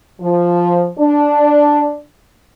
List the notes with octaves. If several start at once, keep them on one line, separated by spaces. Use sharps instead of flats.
F3
D4